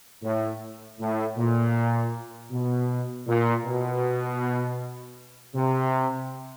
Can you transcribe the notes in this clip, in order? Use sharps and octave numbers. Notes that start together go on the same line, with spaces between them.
A2
A2
A#2
B2
A#2
B2
C3